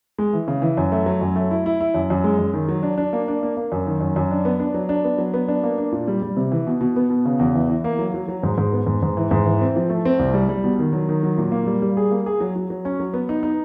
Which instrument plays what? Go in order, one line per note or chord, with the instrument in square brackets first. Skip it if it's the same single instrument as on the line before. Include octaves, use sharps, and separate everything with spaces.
[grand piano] G#3
E3
C#3
E3
F#2
A3
F#3
F#2
A3
E4
E4
E4
F#2
F#2
G#3
F#2
D#3
F#3
D4
D4
A#3
D4
A#3
A#3
F#2
D#3
F#2
F#2
D4
B3
D4
F#3
D4
B3
F#3
B3
D4
A#3
D4
A#2
G3
G3
C3
E3
B2
B2
B3
B2
C#3
E2
E3
E3
A#3
F#3
F#3
F#3
G#2
G#2
B3
G#2
G#2
E3
G#2
E3
C4
F3
A3
C4
C2
G3
G3
B2
D#3
F#3
D#3
F#3
A#2
A#3
G3
G3
G#4
A#3
G#4
F#3
F#3
F#3
C#4
F#3
B3
D#4
D#4